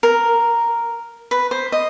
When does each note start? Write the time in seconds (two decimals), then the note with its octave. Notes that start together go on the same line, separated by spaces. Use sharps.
0.03 A#4
1.31 B4
1.51 C5
1.72 D#5